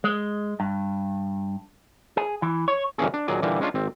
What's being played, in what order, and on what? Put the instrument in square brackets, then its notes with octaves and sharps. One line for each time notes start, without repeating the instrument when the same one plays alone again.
[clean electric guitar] G#3
G2
G#4
E3
C#5
[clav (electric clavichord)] D2 G2 E3 A#3 C#4 G#4
D4
D#2 A#2 F#3 G#4 D5
A#2 D3 E3 G3 A#3
G#3 C#4 D4 F4
G#1 C4